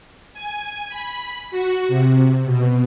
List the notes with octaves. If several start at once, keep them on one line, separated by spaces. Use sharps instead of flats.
G#5
B5
F#4
C3
B2